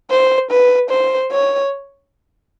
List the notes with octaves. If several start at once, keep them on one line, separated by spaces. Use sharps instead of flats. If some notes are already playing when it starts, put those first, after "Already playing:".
C5
B4
C5
C#5